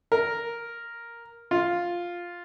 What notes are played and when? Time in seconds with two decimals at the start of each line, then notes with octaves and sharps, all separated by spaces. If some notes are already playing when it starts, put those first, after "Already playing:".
0.12 A#4
1.51 F4